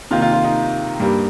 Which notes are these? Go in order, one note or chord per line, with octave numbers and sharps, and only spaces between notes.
C3 D#3 A#3 F4
F4
F4
D#4
G2 G3 A#3